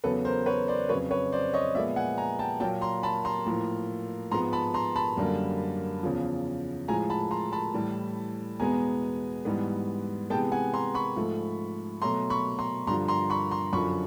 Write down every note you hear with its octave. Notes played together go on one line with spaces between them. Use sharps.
E2 C#3 F#3 B3 A4 B4
A#4 C5
B4 C#5
C5 D5
F2 C#3 F#3 B4 C#5
B4 C#5
C5 D5
C#5 D#5
A#2 F3 G#3 B3 D5 E5
F#5 G#5
G#5 A#5
G5 A5
A#2 F#3 A#3 G5 A5
A#5 C6
A5 B5
A#5 C6
A2 F3 A#3
G#2 F3 G#3 B3 A#5 C6
A5 B5
A#5 C6
A5 B5
F#2 D3 G3 A#3
E2 C#3 F3
A2 F3 G#3 G#5 A#5
A5 B5
A#5 C6
A5 B5
A2 E3 G3
E2 B2 G#3 B3 G#5 A#5
G#2 E3 G3 B3
C3 E3 G#3 B3 G5 A5
F#5 G#5
A#5 C6
B5 C#6
G#2 F3 A3
B2 F#3 A3 A#5 C6
B5 C#6
A#5 C6
G2 D3 F3 A#5 C6
A#5 C6
B5 C#6
A#5 C6
F#2 D3 F3 B5 C#6